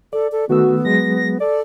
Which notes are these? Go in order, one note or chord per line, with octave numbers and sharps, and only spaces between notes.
A4 D5
A4
D#3 A3 B3 F#4 E6
F#3 G#3 G#4 A#6
A4 D5